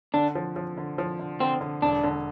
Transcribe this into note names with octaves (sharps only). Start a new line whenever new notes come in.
D3 D4
F3
F3
D3
F3
D3
D3 C4
D3
E1 D4
D3